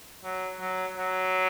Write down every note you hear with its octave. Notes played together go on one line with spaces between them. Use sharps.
F#3
F#3
F#3